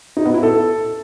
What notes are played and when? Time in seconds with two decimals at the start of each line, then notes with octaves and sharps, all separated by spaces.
0.17 D#4
0.25 B3
0.34 E4
0.43 A4